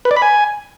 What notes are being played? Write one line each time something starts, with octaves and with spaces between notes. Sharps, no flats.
B4
D5
B5
G#5